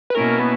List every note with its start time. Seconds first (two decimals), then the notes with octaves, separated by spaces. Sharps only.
0.10 B4
0.15 B2 A#3 C#4 E4 A#4
0.40 B3